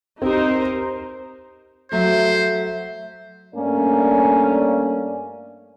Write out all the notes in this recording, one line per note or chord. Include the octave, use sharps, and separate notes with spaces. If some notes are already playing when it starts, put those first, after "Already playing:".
C4 D#4 G4 A#4 C5
F#3 A3 C5 E5
G2 A3 A#3 C#4 D5